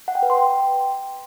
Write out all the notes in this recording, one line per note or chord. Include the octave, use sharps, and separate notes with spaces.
F#5
G5
B4
C6
G5